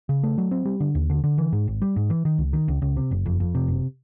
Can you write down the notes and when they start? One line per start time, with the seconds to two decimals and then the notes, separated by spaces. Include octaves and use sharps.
0.09 C#3
0.23 A3
0.38 F#3
0.51 C4
0.65 G3
0.80 D3
0.95 D#2
1.10 D3
1.24 D3
1.38 E3
1.52 G#2
1.67 G#1
1.82 G3
1.96 G#2
2.10 E3
2.25 D#3
2.38 C#2
2.53 D#3
2.68 C#2
2.82 C#2
2.97 C3
3.11 F#1
3.26 F2
3.40 F2
3.55 C3
3.68 F#1